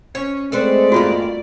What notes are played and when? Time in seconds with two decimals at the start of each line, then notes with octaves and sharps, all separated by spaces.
0.15 C#4 C#5
0.52 G#3 A3 C4 A4 B4 C5 D5
0.92 E2 G2 A#3 F4 F#4